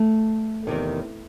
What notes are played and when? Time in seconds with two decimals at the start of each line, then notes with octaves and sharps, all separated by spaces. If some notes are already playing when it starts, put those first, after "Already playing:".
Already playing: A3
0.67 E2 C3 D#3